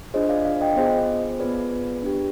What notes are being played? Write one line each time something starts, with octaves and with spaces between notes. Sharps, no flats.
D4 F4 G#4 C5 D#5
D5 F5
D5 F5
D#5 G5
B3 F4 G#4 C5 D#5
B3 F4 G#4 B4 D5
D4 G4